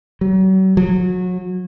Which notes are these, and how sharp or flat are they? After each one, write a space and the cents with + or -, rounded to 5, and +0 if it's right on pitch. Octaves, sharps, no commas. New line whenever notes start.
F#3 +40
F#3 -30